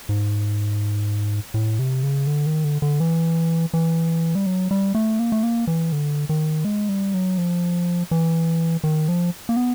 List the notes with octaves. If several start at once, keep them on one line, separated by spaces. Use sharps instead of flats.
G#2
A2
C3
C#3
D3
D#3
D3
D3
E3
E3
G3
F#3
G3
A3
A#3
A3
A#3
E3
D3
D#3
G#3
G3
F#3
F3
E3
D#3
F3
A#3
B3